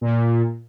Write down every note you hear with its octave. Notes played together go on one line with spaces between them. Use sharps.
A#2